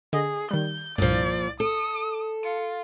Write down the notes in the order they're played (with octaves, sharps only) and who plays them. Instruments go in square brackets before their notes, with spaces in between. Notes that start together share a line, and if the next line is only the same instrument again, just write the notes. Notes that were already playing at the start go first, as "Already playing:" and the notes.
[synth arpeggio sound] D3 D#5 [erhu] G#4
[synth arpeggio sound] D#3 G3 [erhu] G6
[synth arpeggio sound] C2 G2 [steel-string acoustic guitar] A#2 F3 [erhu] D5
[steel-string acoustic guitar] A4 [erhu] D#6
[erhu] F4 [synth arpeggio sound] C#7